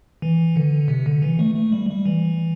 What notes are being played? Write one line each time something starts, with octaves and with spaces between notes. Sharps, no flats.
E3
D3
C3
D3
E3
A3
A3
G3
G3
E3